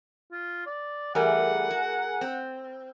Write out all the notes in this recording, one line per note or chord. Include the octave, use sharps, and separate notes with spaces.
F4
D5
E3 G3 A3 G#4 A#4 F#5 G#5
F#4
C4